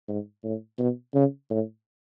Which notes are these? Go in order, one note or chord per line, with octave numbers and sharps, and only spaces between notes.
G#2
A2
B2
C#3
A2